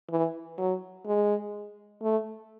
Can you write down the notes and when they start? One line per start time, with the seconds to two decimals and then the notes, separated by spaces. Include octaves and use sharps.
0.11 E3
0.58 F#3
1.07 G#3
2.02 A3